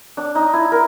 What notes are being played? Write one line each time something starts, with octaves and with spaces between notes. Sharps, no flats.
D4
D#4
E4
A#4